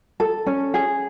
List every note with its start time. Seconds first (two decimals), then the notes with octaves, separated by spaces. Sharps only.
0.20 A4
0.46 C#4
0.74 G#4